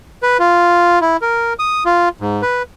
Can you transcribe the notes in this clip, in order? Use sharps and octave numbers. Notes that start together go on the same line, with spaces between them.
B4
F4
E4
A#4
D#6
F4
G#2
B4